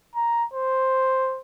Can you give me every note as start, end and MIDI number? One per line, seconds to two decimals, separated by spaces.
0.15 0.44 82
0.53 1.41 72